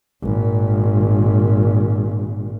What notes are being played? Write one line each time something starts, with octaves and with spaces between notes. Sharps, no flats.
G#1 A#2